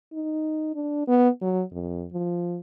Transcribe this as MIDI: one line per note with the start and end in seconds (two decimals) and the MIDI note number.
0.13 0.73 63
0.75 1.04 62
1.08 1.29 59
1.42 1.62 54
1.71 2.06 41
2.13 2.59 53